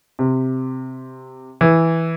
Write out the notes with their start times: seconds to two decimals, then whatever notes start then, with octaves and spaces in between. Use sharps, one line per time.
0.19 C3
1.61 E3